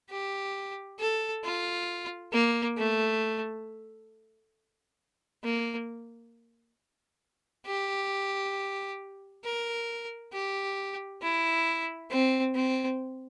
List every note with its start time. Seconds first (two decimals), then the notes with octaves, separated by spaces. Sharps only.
0.10 G4
0.99 A4
1.44 F4
2.33 A#3
2.77 A3
5.44 A#3
7.66 G4
9.44 A#4
10.33 G4
11.22 E4
12.10 C4
12.55 C4